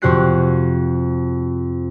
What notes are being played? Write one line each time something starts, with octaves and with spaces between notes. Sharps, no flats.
F2 C3 F#4 G4 F#6 C7